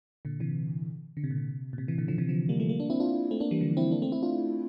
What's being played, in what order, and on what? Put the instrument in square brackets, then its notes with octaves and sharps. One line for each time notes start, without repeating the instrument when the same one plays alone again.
[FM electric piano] A#2 D3
C3 E3
D3
C3
A#2
C3
A#2
C3
C3 E3
A#2 D3
D3 F3
C3 E3
D3 F3
G3 A#3
F3 A3
G3 A#3
A#3 D4
C4 E4
D4 F4
A3 C4
A#3 D4
E3 G3
D3 F3
C4 E4
A#3 D4
A3 C4
C4 E4
D4 F4